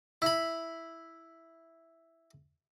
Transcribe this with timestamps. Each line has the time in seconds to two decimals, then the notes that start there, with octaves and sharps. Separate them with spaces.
0.22 E4 B5